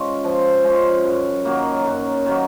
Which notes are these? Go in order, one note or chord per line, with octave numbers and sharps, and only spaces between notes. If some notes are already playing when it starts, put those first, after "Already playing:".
Already playing: G#3 C#4 F4
F3
G#3 C#4 F4
F#2
D#3 F#3 A#3
F#2
D#3 F#3 A#3